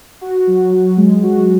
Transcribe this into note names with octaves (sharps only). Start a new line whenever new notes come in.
F#4
F#3
F#3
G#3
F#4